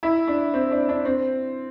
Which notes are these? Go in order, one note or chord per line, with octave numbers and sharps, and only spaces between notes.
E4
D4
C4
D4
D4
C4